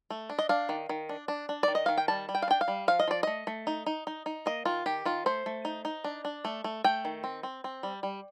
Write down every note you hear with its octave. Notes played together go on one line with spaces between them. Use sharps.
A3
D4
D#5
D4 F5
D#3
D#3
D4
D4
D4
D#3 D5
D#5
D#3 F5
G5
G3 A5
G3
G5
F5
D4 G5
F5
G3
F3 F5
D#5
F3 D5
A3 D#5
A3
D#4
D#4
D#4
D#4
A#3 D#5
D#3 F4
D#3 G4
D#3 F4
A3 C5
A3
D#4
D#4
D4
D4
A3
A3
A3 G5
D#3
C4
C4
C4
G3
G3